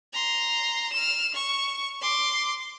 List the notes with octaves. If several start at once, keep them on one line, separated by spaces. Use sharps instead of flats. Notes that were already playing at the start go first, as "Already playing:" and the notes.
A#5 C6
F6 E7
C#6
C6 D6